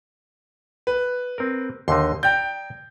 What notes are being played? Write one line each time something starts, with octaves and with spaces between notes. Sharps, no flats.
B4
C4 A#4
D#2 D3 D#4 C6
D5 G5 A#5 G6